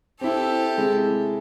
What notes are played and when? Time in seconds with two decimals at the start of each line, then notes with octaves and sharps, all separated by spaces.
0.21 C4 E4 G4 A4
0.77 C3 G#3 E4